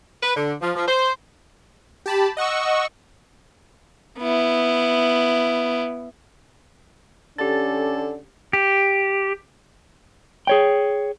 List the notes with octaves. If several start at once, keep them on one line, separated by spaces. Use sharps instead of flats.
B4
D3
F3
F3
C5
G4 A5 B5
D#5 F#5 C#6 E6
B3 E4
D3 C#4 G4 A4 A6
G4
G#4 C#5 G5